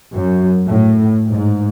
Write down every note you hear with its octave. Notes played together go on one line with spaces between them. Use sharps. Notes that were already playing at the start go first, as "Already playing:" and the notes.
F#2
A2
G#2